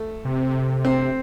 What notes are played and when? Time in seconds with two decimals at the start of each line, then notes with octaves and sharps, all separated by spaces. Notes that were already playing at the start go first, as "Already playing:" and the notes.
Already playing: A3
0.25 C3
0.85 C4